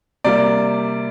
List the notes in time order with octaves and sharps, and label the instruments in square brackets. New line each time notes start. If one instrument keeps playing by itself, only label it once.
[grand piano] C3 G3 A#3 D5